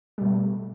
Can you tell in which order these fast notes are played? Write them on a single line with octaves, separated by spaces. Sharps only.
G3 B2 A3